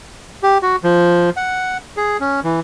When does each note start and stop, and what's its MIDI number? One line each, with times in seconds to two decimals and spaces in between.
0.43 0.58 67
0.62 0.76 66
0.84 1.30 53
1.37 1.77 78
1.97 2.17 68
2.20 2.40 61
2.44 2.60 52